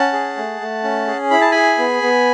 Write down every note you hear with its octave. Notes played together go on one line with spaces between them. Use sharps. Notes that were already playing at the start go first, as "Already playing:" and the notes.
Already playing: C#4 F#5 A5
G#4
A3
A3
C#4
G#4
E4 B5
A5
G#4 G#5 B5
B3
B3